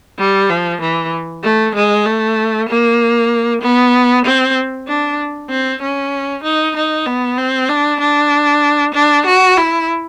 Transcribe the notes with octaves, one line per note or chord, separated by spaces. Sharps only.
G3
F3
E3
A3
G#3
A3
A#3
B3
C4
D4
C4
C#4
D#4
D#4
B3
C4
D4
D4
D4
F#4
E4